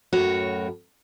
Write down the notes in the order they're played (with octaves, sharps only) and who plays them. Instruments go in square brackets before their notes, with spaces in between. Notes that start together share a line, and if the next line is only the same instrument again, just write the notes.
[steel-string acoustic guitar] F#2 A2 F#4 A#4 C#5